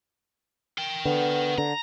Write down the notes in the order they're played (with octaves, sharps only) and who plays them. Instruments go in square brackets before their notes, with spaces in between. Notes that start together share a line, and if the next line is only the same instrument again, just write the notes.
[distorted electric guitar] A#4 G5
[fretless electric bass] D3 [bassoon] B3
[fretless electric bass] D3 [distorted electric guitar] A#5